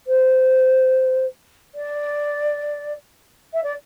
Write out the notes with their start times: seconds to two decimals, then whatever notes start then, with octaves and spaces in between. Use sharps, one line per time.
0.07 C5
1.75 D5
3.54 E5
3.64 D5